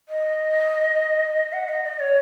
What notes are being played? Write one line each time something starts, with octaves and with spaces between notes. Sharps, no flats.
D#5
F#5
D#5
D#5
C#5